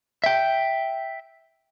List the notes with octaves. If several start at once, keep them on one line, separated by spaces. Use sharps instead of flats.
E5 G5